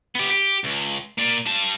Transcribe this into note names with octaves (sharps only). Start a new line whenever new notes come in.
B3 G4
G4
C#2
A#3 D5
G3 A5